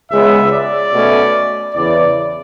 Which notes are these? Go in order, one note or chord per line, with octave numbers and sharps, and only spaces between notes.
C#2 C#3 G#3 B3 E5
D5
B2 A3 C#4
E2 C#3 E3 D5